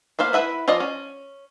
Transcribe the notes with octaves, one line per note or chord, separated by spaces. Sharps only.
A#3 B3 C5 F5
E4 B4 E5 F#5
F3 F4 D5 D#5
C#4